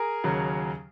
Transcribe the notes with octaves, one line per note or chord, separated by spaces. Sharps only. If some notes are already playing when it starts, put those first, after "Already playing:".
Already playing: G#4 A#4
D#2 C#3 F#3